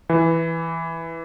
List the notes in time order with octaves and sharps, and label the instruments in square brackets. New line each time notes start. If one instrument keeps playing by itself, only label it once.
[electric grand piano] E3